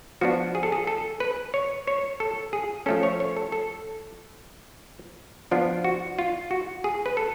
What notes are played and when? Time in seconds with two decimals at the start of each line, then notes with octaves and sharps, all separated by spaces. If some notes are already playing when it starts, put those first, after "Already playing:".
0.21 F3 B3 D4 F#4
0.55 G#4
0.63 A4
0.72 G#4
0.87 A4
1.20 B4
1.54 C#5
1.87 C#5
2.20 A4
2.53 G#4
2.86 F3 A3 C#4 A4
3.03 C#5
3.20 C#5
3.37 A4
3.52 A4
5.51 F3 B3 D4 F4
5.84 F#4
6.19 F4
6.51 F#4
6.84 G#4
7.06 B4
7.17 A4